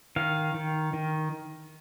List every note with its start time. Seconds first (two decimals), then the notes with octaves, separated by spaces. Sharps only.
0.16 D#3 F5
0.54 D#3
0.93 D#3